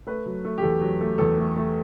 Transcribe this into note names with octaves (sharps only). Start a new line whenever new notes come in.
A3 B4
F#3
A3
G4
E2 A4
F#3
A3
E2 A4
A3
A3